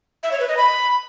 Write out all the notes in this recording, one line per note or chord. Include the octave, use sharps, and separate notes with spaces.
E5
C#5
B4
D#5
B5